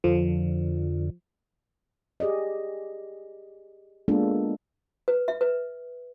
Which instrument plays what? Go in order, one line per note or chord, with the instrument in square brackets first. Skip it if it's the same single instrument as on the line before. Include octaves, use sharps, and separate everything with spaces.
[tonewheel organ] F2 D3 [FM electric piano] F3
[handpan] G4 G#4 D5 D#5
G#3 A#3 B3 D4 F4 A4
[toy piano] B4
E5
B4